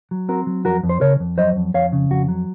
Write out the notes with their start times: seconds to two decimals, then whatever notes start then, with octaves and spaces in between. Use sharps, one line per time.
0.11 F#3
0.29 C4 F#4 A#4
0.47 F#3
0.65 F2 F#4 A#4
0.83 F2
0.89 C5
1.01 C#3 A#4 C#5
1.20 F2
1.38 F#3 C5 D#5
1.56 F2
1.74 F2 C#5 F5
1.93 C#3
2.11 F2 F#4
2.28 F#3